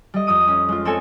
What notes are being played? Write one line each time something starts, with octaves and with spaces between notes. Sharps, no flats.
G3 D#5
F2 D#6 D#7
C#4
G#3 F4
C4 A4 C#5 G#5 E6 E7